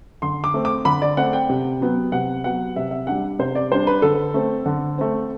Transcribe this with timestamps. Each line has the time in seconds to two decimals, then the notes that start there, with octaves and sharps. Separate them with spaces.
0.22 D3 C6
0.44 D6
0.54 A3 C4
0.65 D6
0.85 D3 B5
1.02 D5
1.17 A3 C4 F#5
1.33 G5
1.49 C3
1.81 F#3 B3
2.12 C3 F#5
2.44 F#3 B3 F#5
2.76 C3 E5
2.91 E5
3.07 G3 D4 F#5
3.39 C3 C5
3.55 D5
3.72 G3 D4 C5
3.87 B4
4.02 D3 A4
4.34 A3 C4
4.66 D3
4.98 A3 C4